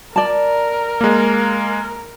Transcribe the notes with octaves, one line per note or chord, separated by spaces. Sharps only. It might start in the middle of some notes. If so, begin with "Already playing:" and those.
A#4 D5 A5
G#3 A#3